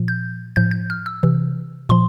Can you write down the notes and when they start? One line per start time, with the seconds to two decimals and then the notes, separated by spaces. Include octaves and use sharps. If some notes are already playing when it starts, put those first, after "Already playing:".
Already playing: A#2 F3
0.08 G6
0.56 A2 F3 G6
0.71 G6
0.90 F6
1.06 E6
1.23 C3 E3
1.89 A#2 F3 C6